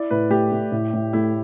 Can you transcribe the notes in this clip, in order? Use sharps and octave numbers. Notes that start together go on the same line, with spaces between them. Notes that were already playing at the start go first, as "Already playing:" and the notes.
Already playing: E4 D5
A2 B4
A3 G4
A3
A2
A2
A3 E4